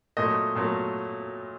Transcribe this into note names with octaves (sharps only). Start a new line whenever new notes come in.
A#2 F#3 A3 D#5
A#2 F#3 A3